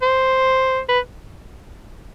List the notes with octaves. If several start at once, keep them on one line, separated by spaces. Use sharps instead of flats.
C5
B4